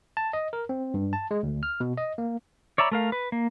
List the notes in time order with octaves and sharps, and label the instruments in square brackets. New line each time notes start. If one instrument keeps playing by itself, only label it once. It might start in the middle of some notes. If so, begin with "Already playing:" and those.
[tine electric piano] A5
D#5
A#4
C4
G2
A5
G#3
D2
F6
B2
D#5
A#3
[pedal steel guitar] C#5 D5 E5 A#5 B5
A3 A#4 F5
B4
A#3